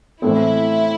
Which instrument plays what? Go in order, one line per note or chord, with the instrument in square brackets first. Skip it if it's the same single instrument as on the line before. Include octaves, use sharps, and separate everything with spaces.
[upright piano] A2 E3 A3 C4 [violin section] E4